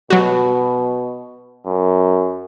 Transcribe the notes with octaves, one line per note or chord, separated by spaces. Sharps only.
B2 F#3 F#4
F#2